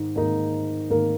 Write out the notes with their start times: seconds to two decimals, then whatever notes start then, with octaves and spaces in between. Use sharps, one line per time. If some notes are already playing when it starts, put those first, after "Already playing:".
Already playing: G#2 D#3 D#4
0.16 G#2 D#3 A#3 D#4 A#4
0.90 G#2 D#3 A#3 D#4 A#4